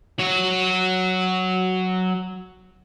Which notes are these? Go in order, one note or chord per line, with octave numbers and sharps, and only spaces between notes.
F#3 C#5